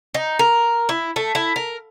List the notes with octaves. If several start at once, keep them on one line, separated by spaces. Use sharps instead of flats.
D#4
A#4
E4
A3
E4
A#4